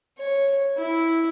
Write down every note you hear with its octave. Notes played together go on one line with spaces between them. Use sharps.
C#5
E4